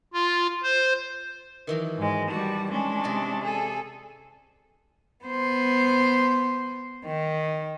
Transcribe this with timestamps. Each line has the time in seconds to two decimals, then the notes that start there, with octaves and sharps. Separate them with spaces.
0.14 F4
0.63 C5
1.67 D#3 E3 F#3
1.97 G#2 G#3
2.29 G3 F#4 A5
2.71 G#3 C#4 D4
3.04 C3 D5 D#5
3.44 G#4 A4
5.24 B3 C5
7.06 D#3